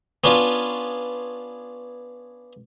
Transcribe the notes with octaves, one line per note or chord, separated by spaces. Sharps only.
B3 C#4 D4 F4